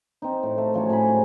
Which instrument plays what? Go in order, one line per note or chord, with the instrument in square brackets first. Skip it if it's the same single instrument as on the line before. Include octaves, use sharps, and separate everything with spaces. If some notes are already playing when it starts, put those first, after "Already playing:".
[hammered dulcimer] C4 D#4
A2
A3
F3 F#3 C#4 C#5
A2 C#5 G#5 B5
G#2